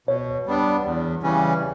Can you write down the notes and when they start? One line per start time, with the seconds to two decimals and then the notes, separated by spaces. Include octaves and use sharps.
0.07 B2 C#5
0.46 G3 B3 D4
0.84 E2
1.23 C#3 E3 G3 C#4